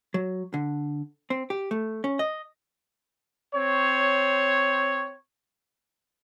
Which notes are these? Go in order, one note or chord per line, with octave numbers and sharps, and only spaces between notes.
F#3
D3
C4
G4
A3
C#4
D#5
C4 C#5